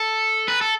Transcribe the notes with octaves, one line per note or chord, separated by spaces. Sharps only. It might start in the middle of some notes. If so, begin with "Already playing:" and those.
Already playing: A4
B4
A4